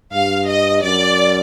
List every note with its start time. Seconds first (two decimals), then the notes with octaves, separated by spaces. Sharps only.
0.13 G2 F5
0.48 D#5
0.83 F#2 D5